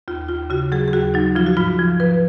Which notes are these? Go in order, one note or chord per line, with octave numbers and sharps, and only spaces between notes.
D#2 F4
D#2 F4
C#3 F#4
F#3 G#4
G#4
D#2 F#4
F#3 D#4
F3 F4
F#4
G#2 F4
F3
F3 B4